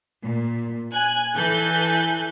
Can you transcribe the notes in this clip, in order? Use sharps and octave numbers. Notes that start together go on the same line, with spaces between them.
A#2
G#5 F#6
E3 A4 G#5 F#6 G6